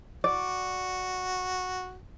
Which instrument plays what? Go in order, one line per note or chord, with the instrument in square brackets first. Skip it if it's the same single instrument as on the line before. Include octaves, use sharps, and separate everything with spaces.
[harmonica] F#4 [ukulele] D5